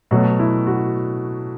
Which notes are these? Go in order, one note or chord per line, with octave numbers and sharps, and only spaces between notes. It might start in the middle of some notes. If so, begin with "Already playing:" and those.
B2 F#3 A3 F#4
E4
F#4